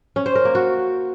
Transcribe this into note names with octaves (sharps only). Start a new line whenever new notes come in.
C#4
C5
A#4
A#3
F#4